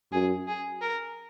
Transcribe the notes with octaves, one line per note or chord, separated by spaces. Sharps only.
F#2 G#4
G#4
A#4